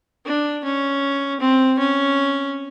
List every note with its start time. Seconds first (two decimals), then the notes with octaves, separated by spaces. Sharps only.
0.26 D4
0.64 C#4
1.40 C4
1.79 C#4